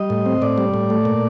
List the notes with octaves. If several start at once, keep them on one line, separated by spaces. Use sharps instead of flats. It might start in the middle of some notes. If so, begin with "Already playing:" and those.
Already playing: G3 D#5
A2
C4
A2 D5
G3
A2
A3
A#2